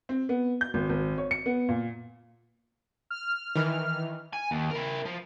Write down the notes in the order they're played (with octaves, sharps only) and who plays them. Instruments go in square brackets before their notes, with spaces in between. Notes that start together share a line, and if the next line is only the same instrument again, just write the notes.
[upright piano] C4
B3
G6
G#1
G#1
C#5
C#7
B3
A#2
[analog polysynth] F6
[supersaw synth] D#3 E3
[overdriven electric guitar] G#5
D#2
E4 A#4
F3